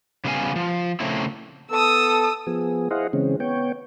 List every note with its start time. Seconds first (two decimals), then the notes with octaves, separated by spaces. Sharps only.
0.25 C#3 G3 B3 F#4 F5 G#5
0.56 F3
1.00 C#3 A3 A#3 C4 E4
1.71 B3 A4 D#6 E6
2.47 F3 B3 G#4
2.91 E4 G#4 C5 D#5 F5 F#5
3.13 C#3 E3 G#3 C4 C#4
3.40 B3 C#5 G5